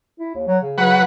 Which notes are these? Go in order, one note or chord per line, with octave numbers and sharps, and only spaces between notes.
E4
D#2
F#3
C#3
F#3 B4 F#5